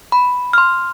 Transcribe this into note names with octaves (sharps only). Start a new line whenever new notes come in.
B5
C6 F6